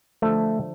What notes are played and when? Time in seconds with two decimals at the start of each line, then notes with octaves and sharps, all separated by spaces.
0.22 D3 F3 A3